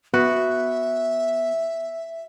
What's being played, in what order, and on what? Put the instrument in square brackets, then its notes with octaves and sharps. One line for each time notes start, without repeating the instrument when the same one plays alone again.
[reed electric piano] B3 [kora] F#4 B4 [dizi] E5